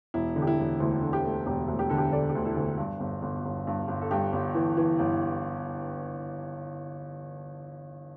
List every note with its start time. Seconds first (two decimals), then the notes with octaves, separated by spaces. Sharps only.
0.14 E1 E4
0.36 D3
0.42 G4
0.47 E4
0.59 E1
0.80 D2 E4
1.02 D3
1.13 G4
1.24 A3
1.46 E1 G4
1.68 D2
1.79 G4
1.90 D3 A4
1.98 G4
2.12 D3 A4 D5
2.29 G4
2.35 D2
2.45 E4 A4
2.57 D2
2.78 G2
3.00 G1
3.22 G1
3.45 G1
3.67 G2
3.88 G1
4.01 A4
4.11 G2 G4
4.32 G1
4.55 E3
4.77 E3
4.99 G1